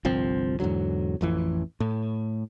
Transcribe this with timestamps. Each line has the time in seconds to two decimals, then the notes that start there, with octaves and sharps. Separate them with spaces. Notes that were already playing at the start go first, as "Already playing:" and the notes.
0.05 G1 C2 F3 C4
0.60 E2 G#2 D3 F#3
1.21 A1 F2 E3
1.80 A2